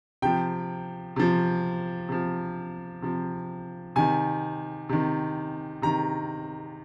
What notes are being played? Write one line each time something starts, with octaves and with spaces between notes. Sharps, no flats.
C3 F3 G5
C3 F3
C3 F3
C3 F3
C3 D#3 G#5
C3 D#3
C3 D#3 A#5